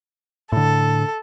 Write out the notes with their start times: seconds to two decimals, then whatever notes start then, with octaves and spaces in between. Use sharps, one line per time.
0.52 A2 D3 A4